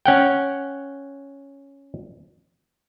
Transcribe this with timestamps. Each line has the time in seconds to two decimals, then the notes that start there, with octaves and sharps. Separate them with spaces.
0.05 C#4 F#5 G5